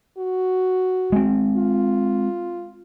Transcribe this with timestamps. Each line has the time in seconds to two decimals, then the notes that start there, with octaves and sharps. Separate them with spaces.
0.18 F#4
1.12 G#3 C4
1.57 F4